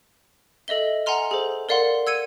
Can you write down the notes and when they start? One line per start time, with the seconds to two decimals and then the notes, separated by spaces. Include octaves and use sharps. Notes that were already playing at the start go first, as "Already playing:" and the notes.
0.68 A4 D#5 E5 G7
1.06 F#5 G#5 A#5 C6 F6
1.31 G#4 A4 C5
1.69 A#4 D5 F5 F#5 C6
2.07 E6 G#6 C#7 D#7